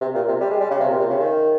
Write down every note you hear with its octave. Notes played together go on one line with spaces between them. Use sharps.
C3
A#2
C3
G3
G#3
G3
C#3
C3
A#2
C3
C#3
D#3